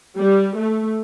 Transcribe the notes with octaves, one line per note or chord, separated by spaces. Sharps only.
G3
A3